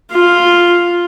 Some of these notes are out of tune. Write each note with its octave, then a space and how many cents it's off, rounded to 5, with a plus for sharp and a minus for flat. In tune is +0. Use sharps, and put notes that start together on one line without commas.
F4 +0